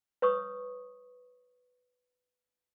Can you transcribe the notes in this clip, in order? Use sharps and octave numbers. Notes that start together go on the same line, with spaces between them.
B4 C#5 C#6 D#6